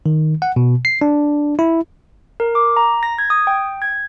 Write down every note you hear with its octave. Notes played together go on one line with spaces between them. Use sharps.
D#3
F#5
B2
C7
D4
E4
A#4
D6
A#5
A#6
G#6
D#6
G5
G#6